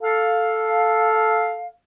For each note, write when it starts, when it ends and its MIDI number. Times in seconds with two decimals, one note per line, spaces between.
0.01 1.68 69
0.01 1.68 77